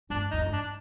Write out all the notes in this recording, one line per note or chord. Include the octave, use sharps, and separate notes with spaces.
G2 D4
F2 D#4
G2
D4